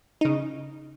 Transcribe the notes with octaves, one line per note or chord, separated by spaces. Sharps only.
C#3 D#4